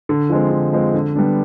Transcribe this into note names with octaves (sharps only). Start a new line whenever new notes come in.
D3
F3 G#3 C4
D3
F3 G#3 C4
D3
G3 B3 D4